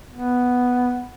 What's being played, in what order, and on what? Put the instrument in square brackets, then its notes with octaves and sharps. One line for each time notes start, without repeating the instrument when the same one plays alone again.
[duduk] B3